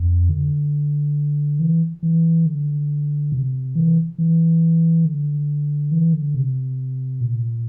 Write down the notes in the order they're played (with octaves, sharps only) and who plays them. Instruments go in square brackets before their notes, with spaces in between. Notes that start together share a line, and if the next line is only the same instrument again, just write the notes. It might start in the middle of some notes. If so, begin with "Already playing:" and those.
Already playing: [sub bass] F2
D3
E3
E3
D3
C3
E3
E3
D3
E3
D3
C3
A#2